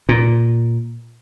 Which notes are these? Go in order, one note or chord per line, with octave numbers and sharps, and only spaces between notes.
A#2